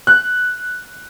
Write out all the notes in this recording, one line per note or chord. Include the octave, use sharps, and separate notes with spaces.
F#6